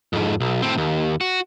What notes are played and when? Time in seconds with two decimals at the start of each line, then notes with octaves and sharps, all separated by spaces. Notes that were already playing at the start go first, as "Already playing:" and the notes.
0.13 F2 G#2
0.41 B1
0.62 A2 C4
0.78 D#2
1.21 F#4